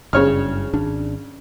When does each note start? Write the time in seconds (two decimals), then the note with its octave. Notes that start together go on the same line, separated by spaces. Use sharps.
0.13 F#1 G2 C#3 C#5 F6
0.73 G#1 D4